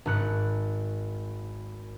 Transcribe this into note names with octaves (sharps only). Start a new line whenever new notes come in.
G#1 G#2 F#6 C#7